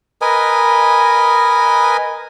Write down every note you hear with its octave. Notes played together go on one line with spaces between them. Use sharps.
A#4 B4 D#5 G#5